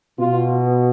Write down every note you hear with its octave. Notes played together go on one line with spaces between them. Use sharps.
B2 F4